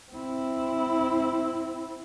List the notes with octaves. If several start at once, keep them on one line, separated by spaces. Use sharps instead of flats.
C4 E4